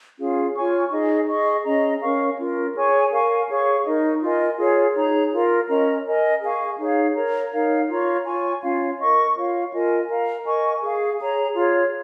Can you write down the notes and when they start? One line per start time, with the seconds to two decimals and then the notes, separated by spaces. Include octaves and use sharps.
0.18 C#4 F4 G#4 F5
0.55 F4 C#5 G#5 C#6
0.91 D#4 G#4 D#5
1.28 G#4 D#5 C#6
1.64 C#4 G#4 D#5 A#5
2.01 C#4 A#4 F5 C#6
2.38 C#4 F4 A#4
2.74 G#4 C#5 G#5 C#6
3.11 A#4 F5 G#5 C#6
3.48 G#4 C#5 F5 C#6
3.84 D#4 A#4 D#5
4.21 F4 A#4 D#5 G#5
4.58 F4 G#4 C#5
4.94 D#4 G#4 C#5 A#5
5.32 F4 A#4 F5
5.68 C#4 A#4 D#5 A#5
6.04 A#4 D#5 G#5
6.42 G#4 F5 G#5 C#6
6.78 D#4 G#4 C#5 F5
7.15 A#4 C#5 A#5
7.52 D#4 A#4 C#5 F5
7.88 F4 C#5 A#5 C#6
8.25 F4 C#5 G#5 C#6
8.61 C#4 F4 C#5 F5
8.98 A#4 D#5 C#6
9.35 F4 C#5 F5
9.71 F4 A#4 D#5 G#5
10.08 A#4 F5 A#5
10.45 A#4 D#5 G#5 C#6
10.82 G#4 F5 G#5
11.18 G#4 C#5 A#5
11.55 F4 G#4 C#5